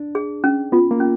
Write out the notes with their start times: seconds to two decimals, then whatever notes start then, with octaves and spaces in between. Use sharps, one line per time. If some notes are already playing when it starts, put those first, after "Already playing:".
Already playing: D4
0.15 G#4
0.44 C#4
0.72 B3 F4
0.91 A#3
1.00 C#4